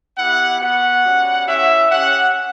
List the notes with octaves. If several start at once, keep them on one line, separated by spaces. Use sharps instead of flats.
B3 E4 G4 F#5
B3 F#4 F#5
G3 C#4 F#4
C#4 E4 G4 E5
C#4 G4 F#5